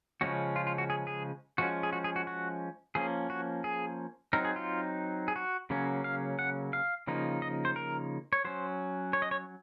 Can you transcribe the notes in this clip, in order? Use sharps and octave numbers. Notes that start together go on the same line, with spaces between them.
C#3 F3 G#3 C#4 F#4
F4
F4
F#4
G#4
G#4
F3 G#3 C#4 F#4
G#4
F#4
G#4
F#4
F#4
F3 A#3 C#4 G#4
F#4
G#4
F#3 C4 D#4 A#4
G#4
F4
G#4
F#4
C#3 F#3 A#3 C#4
F5
F#5
F5
C#3 F3 A#3 D#4
D#5
C5
A#4
C#5
F#3 C#4 C5
C#5
D#5
C#5